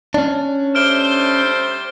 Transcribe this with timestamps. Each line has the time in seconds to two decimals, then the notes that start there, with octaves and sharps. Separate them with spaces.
0.14 C#4 D4
0.75 G3 A3 C5 F6 D7 G7